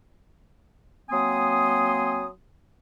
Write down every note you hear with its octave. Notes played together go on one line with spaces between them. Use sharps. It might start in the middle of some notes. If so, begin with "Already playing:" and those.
F#3 A#3 C4 G#5 C6 D#6